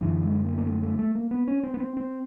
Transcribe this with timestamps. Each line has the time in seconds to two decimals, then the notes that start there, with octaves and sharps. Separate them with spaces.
0.01 F#2 D3 E3
0.23 G#3
0.44 A#3
0.58 A#3
0.67 A3
0.82 A3
0.99 A3
1.15 A#3
1.31 B3
1.48 C#4
1.63 C4
1.74 B3
1.80 C4
1.97 C4